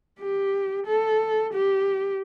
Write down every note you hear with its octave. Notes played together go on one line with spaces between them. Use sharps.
G4
A4
G4